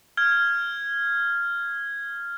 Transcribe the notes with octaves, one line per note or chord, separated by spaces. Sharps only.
F6 G#6